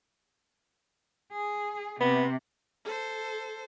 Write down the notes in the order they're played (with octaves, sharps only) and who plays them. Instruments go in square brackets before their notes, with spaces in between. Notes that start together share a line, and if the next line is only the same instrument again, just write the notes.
[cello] G#4
[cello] C3 [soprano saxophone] B3
[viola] A4 C5